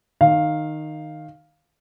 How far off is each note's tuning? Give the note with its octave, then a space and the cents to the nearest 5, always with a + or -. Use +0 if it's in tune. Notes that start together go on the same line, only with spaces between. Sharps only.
D#3 -10 F5 +0